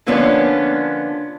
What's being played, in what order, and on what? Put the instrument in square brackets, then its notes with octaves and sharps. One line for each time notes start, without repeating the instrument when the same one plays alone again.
[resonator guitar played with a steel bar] D3 F3 A#3 B3 C#4 D4